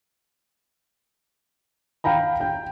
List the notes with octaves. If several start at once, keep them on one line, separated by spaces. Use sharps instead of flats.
F5 G5 A#5 B5
G5